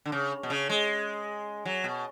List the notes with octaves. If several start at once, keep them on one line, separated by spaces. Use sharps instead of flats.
D3
C#3
B2
C#3
G#3
F#3
B2